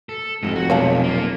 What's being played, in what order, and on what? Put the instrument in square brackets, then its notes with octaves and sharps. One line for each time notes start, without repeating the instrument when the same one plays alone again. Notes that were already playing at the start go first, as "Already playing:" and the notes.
[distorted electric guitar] A4
[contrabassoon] F1 [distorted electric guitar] G#2
[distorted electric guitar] F#4
[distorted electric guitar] B1 [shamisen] C#5 F5 A5
[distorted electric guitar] A#3 F4